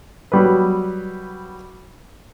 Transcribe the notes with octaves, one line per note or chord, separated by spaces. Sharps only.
F#3 G3 B4